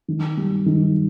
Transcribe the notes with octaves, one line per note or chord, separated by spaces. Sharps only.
D#3
G3
D#3